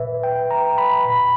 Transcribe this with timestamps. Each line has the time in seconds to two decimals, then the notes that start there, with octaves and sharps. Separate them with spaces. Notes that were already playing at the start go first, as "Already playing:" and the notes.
Already playing: A#2 B4 E5
0.24 G5
0.51 A#5
0.78 B5
1.04 A#2 B5